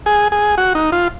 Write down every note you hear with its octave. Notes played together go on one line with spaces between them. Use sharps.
G#4
G#4
F#4
D#4
F4